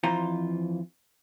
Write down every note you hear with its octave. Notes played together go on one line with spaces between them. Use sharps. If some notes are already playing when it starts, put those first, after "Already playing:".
F2 E3 F4 C5 A#5